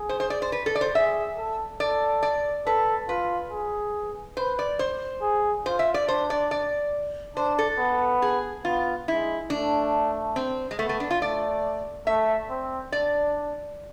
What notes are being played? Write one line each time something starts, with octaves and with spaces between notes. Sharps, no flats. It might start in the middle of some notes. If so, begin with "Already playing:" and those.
Already playing: G#4
C5
C5
D5
C5
B4
A4
D5
C5
G#4 E5
A4
A4 D5
D5
A4 B4
F4 B4
G#4
B4 C5
D5
C5
G#4
F4 C5
E5
D5
D4 C5
D5
D5
D4 C5
A4
B3
G#4
B3 F4
G#3 E4
A3 D4
C4
G#3
A3 B3
A3
D4
F4
A3 D5
A3 E5
C4
D4 D5